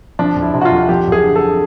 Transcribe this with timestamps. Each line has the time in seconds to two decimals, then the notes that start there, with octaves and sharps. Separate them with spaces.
0.19 F3 D4
0.36 F2
0.42 E4
0.54 C3
0.61 F#4
0.65 F4
0.72 F2
0.89 F3 G4
1.07 F#2
1.12 G#4
1.24 D3
1.36 A4